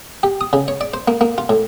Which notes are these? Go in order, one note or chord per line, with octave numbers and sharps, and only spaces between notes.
G4
D#6
C#3
C#5
D5
C5
A#3
A#3
F4
A2